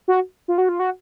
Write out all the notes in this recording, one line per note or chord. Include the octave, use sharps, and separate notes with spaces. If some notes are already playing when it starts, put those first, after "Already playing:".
F#4
F4
F#4
F4
F#4